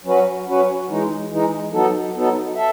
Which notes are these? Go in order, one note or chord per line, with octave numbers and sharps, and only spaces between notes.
F#3 C#4 F#4 B4
F#3 C#4 F#4 B4
E3 G#3 D#4
E3 G#3 D#4
F#3 B3 D#4 A4
F#3 B3 D#4 A4
A4 E5